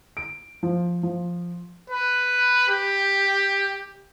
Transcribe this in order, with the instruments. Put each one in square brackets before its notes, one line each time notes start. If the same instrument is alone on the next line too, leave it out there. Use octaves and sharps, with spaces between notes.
[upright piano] D7
F3
F3
[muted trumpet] B4
G4